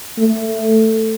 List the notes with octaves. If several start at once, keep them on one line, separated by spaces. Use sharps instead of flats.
A3